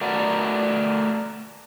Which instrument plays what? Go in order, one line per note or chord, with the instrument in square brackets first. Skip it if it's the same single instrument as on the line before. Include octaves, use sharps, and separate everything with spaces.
[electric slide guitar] A3 F#4 A#4 B4 D5